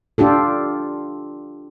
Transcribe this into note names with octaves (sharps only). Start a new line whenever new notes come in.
D4 F4 G4 A4